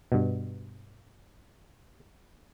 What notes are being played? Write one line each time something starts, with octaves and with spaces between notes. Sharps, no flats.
G2 B2